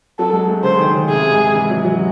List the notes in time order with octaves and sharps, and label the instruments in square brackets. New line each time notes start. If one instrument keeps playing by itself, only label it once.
[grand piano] F#3 [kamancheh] A4
[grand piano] G#3
A3
[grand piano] C#3 [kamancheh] C5
[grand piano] D#3
C#3
[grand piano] C3 [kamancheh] G#4
[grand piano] G#2
E3
F#3
F#3